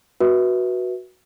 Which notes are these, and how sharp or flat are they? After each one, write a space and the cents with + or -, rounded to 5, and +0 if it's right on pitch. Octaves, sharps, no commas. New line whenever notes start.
F#4 +0 B4 -20 E5 -20